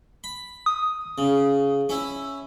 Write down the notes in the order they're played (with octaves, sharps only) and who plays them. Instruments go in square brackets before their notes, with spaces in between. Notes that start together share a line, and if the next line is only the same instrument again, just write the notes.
[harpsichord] B5
[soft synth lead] D#6
[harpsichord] C#3
C#4 E4